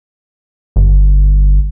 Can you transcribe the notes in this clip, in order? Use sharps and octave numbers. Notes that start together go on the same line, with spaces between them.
G1